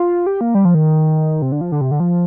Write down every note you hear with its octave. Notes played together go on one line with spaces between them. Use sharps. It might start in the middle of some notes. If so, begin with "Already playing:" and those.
Already playing: F4
G4
A#3
G3
F3
D#3
C3
D3
F3
D3
C3
D3
F3